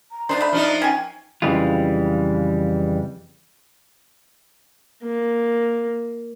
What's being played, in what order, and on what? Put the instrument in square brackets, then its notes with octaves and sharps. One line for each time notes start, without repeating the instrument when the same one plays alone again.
[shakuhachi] A#5
[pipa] F3 D#4 C5 [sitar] D4
[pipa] A3 B5
[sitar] F3 D4 D#4 [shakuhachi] E5
[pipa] C#4 G#5 [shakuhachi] G5
[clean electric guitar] F2 C#3 E3 G3 G#3 F4
[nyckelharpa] A#3